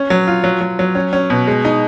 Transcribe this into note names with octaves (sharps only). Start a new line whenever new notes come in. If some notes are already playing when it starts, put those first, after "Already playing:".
Already playing: C#4
F#3
F4
F#3
F#3
F#3
C#4
C#4
B2
G#3
D#4